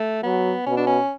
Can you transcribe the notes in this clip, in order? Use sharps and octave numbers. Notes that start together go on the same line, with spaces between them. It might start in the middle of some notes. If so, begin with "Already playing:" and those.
Already playing: A3
F#3 B3
B2 C#4
D4
C#4